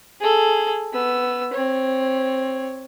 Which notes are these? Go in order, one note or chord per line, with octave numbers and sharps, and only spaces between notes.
G#4 A4
B3 E6
C4 C#5